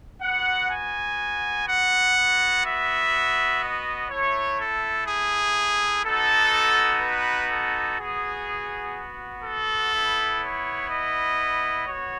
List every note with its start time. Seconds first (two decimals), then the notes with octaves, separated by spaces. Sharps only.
0.21 B3 F#4 F#5
0.70 G#5
1.67 F#5
2.16 B3 F#4
2.64 E5
3.61 D#5
4.09 A3 E4 C#5
4.58 A4
5.06 G#4
6.04 B3 D#4 F#4 A4
7.00 B4
7.49 A4
7.98 B3 F#4 G#4
9.44 A4
9.93 B3 E4
10.40 C#5
10.90 D#5
11.86 B3 F#4 C#5